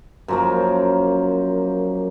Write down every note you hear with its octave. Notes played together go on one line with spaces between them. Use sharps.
F#2 F3 A#3